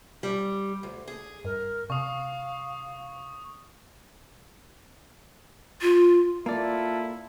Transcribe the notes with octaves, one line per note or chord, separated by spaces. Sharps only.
G3
D2
G#4
G2 A#4
C3 F5 C#6 D#6
F4
A#3 E4 F4 A4 D5